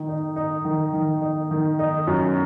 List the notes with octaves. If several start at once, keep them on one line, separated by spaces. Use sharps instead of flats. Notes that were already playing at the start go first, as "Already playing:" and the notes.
Already playing: D#3
D#4
D#4
D#3
D#3
D#4
D#3
D#4
F#2